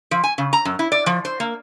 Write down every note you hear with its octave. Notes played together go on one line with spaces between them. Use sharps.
F3
G#5
C#3
A#5
F#2
E4
D5
F3
C5
A#3